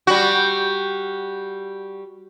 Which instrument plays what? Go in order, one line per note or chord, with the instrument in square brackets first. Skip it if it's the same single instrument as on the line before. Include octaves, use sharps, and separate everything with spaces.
[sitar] G3 F#4